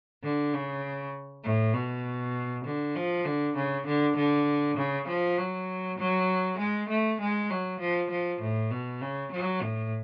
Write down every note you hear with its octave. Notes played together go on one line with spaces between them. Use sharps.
D3
C#3
A2
B2
D3
F3
D3
C#3
D3
D3
C#3
F3
F#3
F#3
G#3
A3
G#3
F#3
F3
F3
A2
B2
C#3
F#3
A2